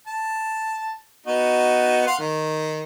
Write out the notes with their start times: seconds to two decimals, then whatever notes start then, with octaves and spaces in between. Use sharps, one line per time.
0.07 A5
1.27 B3 D#4 F#4
2.07 F5 F#5 C6
2.19 D#3